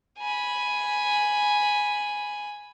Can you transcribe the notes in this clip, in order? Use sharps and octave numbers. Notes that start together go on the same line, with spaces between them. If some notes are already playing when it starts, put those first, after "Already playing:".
G#5 B5